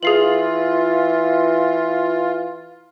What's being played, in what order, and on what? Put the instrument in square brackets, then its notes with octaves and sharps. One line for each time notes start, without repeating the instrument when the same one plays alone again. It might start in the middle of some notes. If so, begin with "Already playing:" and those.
[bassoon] E3 [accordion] F4 [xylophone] G#4 C7 F#7